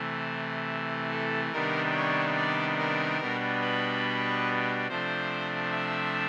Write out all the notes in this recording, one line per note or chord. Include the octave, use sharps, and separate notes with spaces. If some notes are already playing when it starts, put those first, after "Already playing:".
Already playing: C3 E3 A3
A4
C3 D#3 G3 B3 D4 A#4
C#5
D5
A#4
B2 G3 B3 D4
B4
C3 F3 A3 D4 C5
E5